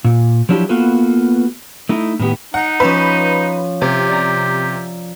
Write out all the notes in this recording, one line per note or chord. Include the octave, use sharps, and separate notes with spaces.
A#2
F3 F#3 D4 E4 F#4 G4
A#3 B3 F4 F#4 A4 B4
A3 D#4 E4
A2 D#3 B3 G4
D#4 F#5
F3 C#4 B4 E5
C3 G4
D5 A#5